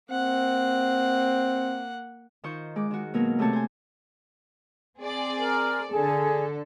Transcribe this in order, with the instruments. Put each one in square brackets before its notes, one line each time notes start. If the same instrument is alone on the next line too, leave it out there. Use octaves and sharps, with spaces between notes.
[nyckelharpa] A#3 F#5 [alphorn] C4
[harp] D#3 F4 C5 C#6 G6
G#3 D6
D#3 F#4
B2 F#3 A#3 A#4
C3 A3 C4 C#5 A5
C5 G#5
[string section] C4 G#4 D5
[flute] A#4
[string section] D3 A4 [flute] G#4